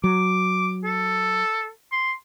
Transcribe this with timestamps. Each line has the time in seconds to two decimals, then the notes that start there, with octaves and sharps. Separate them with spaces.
0.04 F#3 D6
0.84 A4
1.92 C6